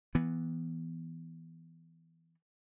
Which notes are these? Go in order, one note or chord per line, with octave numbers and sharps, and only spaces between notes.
E3 B3